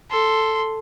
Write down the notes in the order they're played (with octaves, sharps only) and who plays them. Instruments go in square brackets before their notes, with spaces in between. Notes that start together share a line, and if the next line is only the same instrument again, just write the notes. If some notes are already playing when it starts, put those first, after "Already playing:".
[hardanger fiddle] A4 [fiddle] C6